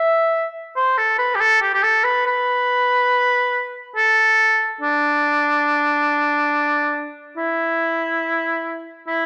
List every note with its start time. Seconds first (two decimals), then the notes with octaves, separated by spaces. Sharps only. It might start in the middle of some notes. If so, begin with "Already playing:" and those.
Already playing: E5
0.76 C5
0.98 A4
1.19 B4
1.35 G4
1.40 A4
1.62 G4
1.74 G4
1.83 A4
2.04 B4
2.26 B4
3.97 A4
4.81 D4
7.37 E4
9.08 E4